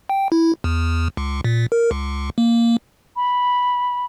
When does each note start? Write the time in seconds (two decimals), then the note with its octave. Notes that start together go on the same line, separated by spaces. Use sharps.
0.09 G5
0.32 E4
0.64 E2
1.17 C#2
1.44 A#2
1.72 A#4
1.91 C#2
2.38 A#3
3.16 B5